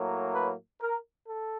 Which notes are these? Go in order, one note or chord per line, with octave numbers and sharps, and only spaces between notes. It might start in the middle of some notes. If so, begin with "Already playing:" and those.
Already playing: A2 F#3 A#3
B4
A#4
A4